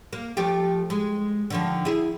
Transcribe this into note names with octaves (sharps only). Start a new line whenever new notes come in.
A#3
F3 A3 G4
G#3
D3 D#3 F3
E4 G#4